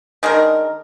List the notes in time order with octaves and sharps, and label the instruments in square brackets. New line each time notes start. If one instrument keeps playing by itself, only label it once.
[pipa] D#3 G#3 D4 A#4